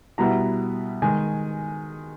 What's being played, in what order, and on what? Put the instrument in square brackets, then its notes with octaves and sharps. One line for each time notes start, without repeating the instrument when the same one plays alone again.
[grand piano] B2 G3 B3 E4 A#5
D#3 G#3 G#5